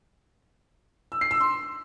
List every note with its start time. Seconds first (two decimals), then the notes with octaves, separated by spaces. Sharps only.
1.12 E6
1.21 C7
1.31 E6
1.40 C6